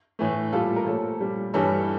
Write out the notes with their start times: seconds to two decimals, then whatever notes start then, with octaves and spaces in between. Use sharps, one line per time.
0.19 A2 E3 A3
0.53 A#2 G3 F4 A4
0.76 A#4
0.86 A#2 F3 A3 A4 C#5
1.21 A#2 G3
1.54 G2 E3 G3 A4 C#5